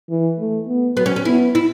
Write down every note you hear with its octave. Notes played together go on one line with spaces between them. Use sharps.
E3
A3
B3
F#3 B3
C#4
C#4
B3 E4
E4